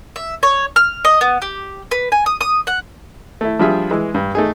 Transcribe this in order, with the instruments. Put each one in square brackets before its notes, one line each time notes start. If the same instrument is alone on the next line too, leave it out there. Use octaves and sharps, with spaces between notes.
[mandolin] E5
C#5
F6
D#5
B3
G4
B4
G#5
D#6
D#6
F#5
[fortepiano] A3 E4
F3 G3 D4 F4 G#4 E5
E3 G#3
G2
A3 D#4 G#4